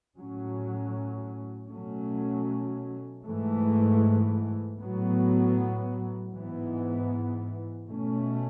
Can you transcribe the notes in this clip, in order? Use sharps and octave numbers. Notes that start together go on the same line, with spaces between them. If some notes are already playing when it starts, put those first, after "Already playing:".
A2 F#3 C#4
B2 F#3 A3 C#4
G#2 E3 A3
A2 F#3 B3
G#2 E3 B3
B2 A3 C#4